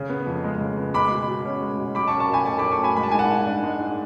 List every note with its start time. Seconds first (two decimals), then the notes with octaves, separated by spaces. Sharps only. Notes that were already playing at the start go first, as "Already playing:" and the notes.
Already playing: C#3
0.09 B3
0.26 F2
0.44 G#3
0.61 C#3
0.78 B3
0.94 G#3 B5 D6
1.11 B2
1.28 B2
1.45 C#4
1.61 G#3
1.78 B2
1.95 F#3 B5 D6
2.08 A5 C#6
2.13 C#4
2.20 A5 C#6
2.29 B2 G#5 B5
2.46 A3 A5 C#6
2.58 F#3 B5 D6
2.72 A5 C#6
2.80 C#4 G#5 B5
2.97 G#3 B5
3.03 A5
3.11 G#2 G#5
3.19 F#5 A5
3.30 G#2
3.47 D4
3.64 G#3
3.80 G#2